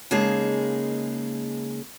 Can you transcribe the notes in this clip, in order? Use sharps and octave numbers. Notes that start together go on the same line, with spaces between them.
C#3 G#3 A#3 D#4 G#4 A5